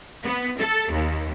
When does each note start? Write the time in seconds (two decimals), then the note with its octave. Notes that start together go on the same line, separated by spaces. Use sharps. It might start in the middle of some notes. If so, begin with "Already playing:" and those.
0.23 B3
0.58 A4
0.91 D#2